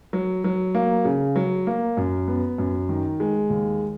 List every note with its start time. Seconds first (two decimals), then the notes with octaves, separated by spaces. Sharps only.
0.13 F#3
0.44 F#3
0.75 A#3
1.05 C#3
1.36 F#3
1.67 A#3
1.97 F#2
2.28 B3
2.58 F#2
2.89 D#3
3.20 G#3
3.50 D#2